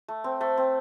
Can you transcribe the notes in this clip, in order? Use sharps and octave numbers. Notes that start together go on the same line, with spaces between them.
A3
C4
A3
C4